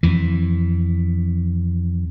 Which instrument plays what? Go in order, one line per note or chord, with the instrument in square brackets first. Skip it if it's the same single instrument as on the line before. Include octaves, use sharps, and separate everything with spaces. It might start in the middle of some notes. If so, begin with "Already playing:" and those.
[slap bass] F2 E3